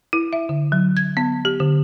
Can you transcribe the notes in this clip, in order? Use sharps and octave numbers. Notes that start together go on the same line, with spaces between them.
E4
E5
D3
F#3
G#6
B3
G4
D3